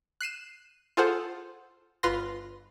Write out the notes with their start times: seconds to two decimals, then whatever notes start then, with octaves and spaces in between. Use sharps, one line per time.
0.21 F#6 C7 D#7 E7
0.97 F4 G#4 A4 C5 F#5
2.03 G1 F4 B4 C6 A#6